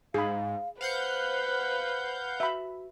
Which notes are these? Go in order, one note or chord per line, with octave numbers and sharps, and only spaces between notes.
G#2 G#4 F5 B5
B4 C5 F5 F#5 G6
F#4 E5 B5